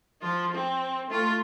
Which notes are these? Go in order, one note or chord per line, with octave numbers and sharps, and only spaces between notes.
F3 F4
C4
A3 F4